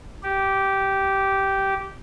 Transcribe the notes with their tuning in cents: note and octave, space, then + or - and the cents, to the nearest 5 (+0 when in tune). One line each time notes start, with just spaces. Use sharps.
G4 -10